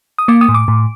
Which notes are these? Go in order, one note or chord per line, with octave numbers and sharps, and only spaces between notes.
D#6
A#3 D6
D#6
A2
D6
A2